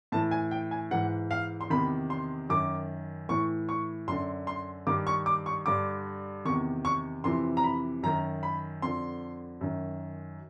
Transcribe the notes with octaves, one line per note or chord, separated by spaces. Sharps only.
A2 E3 A5
G#5
G5
G#5
G#2 E3 F#5
F5
C6
E2 C3 D#3 B5
C6
F#2 D#3 D6
A2 E3 C#6
C#6
F#2 D3 C6
C6
G2 D#3 D6
C#6
D6
C#6
G2 D3 D6
E2 C3 D#3 C#6
C#6
F2 C3 E3 C6
A#5
B5
F#2 D#3 A#5
B5
F2 D3 C6
F#2 D#3